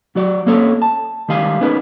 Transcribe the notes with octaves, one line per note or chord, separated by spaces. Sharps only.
F#3 F#4 D5
A#3 C4 C#4 A4 C#5
A5
D#3 G3 G#3 F5 G#5
B3 C#4 D#4 G#4 A#4 B4